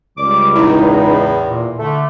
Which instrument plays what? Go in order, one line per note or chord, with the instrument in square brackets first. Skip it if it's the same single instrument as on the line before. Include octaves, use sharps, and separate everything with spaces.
[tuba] C#2 [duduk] G3 [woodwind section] D6
[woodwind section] E2 A2 [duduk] D#4 [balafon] E4
[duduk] A#2
[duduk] D3 [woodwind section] A3